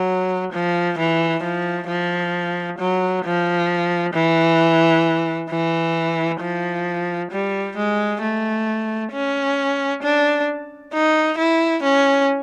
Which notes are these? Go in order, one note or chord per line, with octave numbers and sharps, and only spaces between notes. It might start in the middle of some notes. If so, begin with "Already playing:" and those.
Already playing: F#3
F3
E3
F3
F3
F#3
F3
E3
E3
F3
G3
G#3
A3
C#4
D4
D#4
E4
C#4